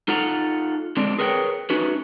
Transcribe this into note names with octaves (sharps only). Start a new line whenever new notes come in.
D#4 F4 A4 F#5 A#5
D3 G#3 C4 D4
G#4 A#4 B4 C#5 F#5 G5
A3 C#4 D#4 F#4 B4